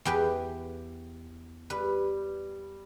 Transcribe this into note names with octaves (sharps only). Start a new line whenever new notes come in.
E2 G4 B4
G3 B4